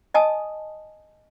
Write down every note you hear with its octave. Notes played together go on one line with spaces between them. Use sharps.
D#5 G#5 A5 D#6